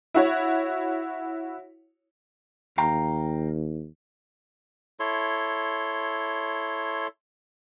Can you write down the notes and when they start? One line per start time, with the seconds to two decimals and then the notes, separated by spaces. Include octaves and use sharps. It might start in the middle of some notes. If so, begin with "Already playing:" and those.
0.14 E4 F#4 C#5
2.78 D#2 F5 G5 A#5
5.00 E4 A4 C#5 C6